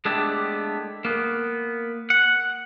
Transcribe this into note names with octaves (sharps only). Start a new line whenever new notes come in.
G#3 A3 B3 D4 E4 G4
A#3 B3
F#5